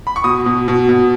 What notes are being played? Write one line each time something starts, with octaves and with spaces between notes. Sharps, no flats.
B5
C#6
B2 D#6
B2
B2
B2